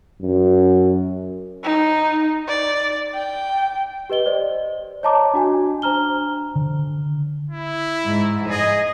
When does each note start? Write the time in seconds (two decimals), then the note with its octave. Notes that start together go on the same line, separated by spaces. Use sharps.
0.22 F#2
1.64 D#4
2.48 D5
3.14 G5
4.10 G4 B4 D#5 G7
4.26 C5 D5 D#5
5.03 C#5 D#5 A5 A#5 D6
5.34 D4 F#4 G#5
5.82 D4 C5 A#5 F6 G7
6.56 D3
7.50 E4
8.06 G#2
8.50 G#4 D#5